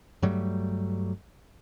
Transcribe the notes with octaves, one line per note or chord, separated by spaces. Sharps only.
G2 F#3 G3 A3